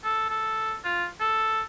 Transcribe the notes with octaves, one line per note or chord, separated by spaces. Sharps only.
A4
A4
F4
A4